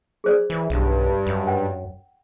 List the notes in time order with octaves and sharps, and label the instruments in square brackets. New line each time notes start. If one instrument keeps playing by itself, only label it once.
[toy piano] G#4 C5 D5
[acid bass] E3
[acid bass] B1 [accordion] G2
[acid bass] F#2
[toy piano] F#5 G5